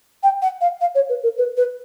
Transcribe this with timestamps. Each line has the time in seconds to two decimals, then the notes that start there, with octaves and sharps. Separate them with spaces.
0.23 G5
0.42 F#5
0.61 F5
0.81 F5
0.94 C#5
1.09 B4
1.23 A#4
1.38 B4
1.57 B4